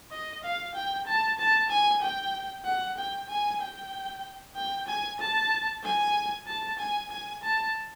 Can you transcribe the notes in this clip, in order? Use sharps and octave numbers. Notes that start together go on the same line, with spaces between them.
D#5
F5
G5
A5
A5
G#5
G5
F#5
G5
G#5
G5
G5
G#5
A5
G#5
A5
G#5
G#5
A5